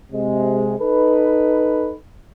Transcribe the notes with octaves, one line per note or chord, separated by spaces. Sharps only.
C3 G#3
D#4 A4 B4